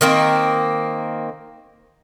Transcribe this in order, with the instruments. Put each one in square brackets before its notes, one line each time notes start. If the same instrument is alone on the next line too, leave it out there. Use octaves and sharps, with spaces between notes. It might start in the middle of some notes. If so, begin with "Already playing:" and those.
[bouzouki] D#3 A#3 C4